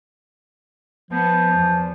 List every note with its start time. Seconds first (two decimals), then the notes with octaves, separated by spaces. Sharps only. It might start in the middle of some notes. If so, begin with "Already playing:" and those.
1.11 F3 B3
1.54 E2